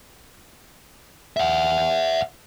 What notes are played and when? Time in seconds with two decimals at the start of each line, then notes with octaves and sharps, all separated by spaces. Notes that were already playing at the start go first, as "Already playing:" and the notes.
1.37 E5 F#5